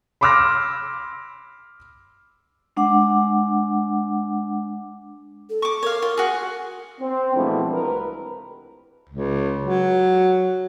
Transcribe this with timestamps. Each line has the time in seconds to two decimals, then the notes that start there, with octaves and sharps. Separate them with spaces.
0.21 B5 C6 D6 E6 F6 A#6
2.77 G#3 D4 F#5 D6
5.50 A4
5.62 C#6 D6
5.83 A#4 C#5 F5
6.02 F4 A#4
6.17 F#4 G#4
7.01 C4
7.35 B2 E3 F3 G#3 A3 D4
7.72 C2 A#4 B4
9.10 C#2
9.63 F#3